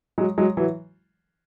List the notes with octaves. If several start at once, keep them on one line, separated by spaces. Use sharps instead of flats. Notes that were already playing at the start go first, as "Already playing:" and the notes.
F#3 G#3
F#3 G#3
E3 F#3